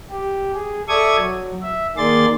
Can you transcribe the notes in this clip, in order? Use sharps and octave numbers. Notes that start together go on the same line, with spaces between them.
G4
G#4
A4 D5 E5 C#6 D#6 G#6
F#3
E5
D#3 A#3 G#4 D5 C6 A6